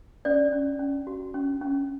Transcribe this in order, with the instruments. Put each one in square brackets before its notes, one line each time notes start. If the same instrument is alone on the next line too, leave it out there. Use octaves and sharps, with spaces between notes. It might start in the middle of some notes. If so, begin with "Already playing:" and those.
[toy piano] C#4 D5
C#4
C#4
F#4
C#4
C#4